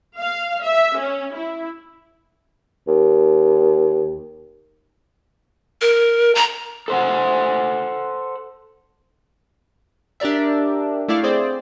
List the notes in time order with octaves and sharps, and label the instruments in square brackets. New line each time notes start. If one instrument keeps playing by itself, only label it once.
[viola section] F5
E5
C#4
E4
[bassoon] D#2
[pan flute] A#4
A#5
[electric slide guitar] A4 C5 F#5
[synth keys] D4 G4 A#4 D5 E5
A3 E4 D5 F5
C4 G#4 C5 D5